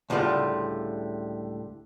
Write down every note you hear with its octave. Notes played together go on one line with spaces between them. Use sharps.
C#2 A2 D3 G3 F4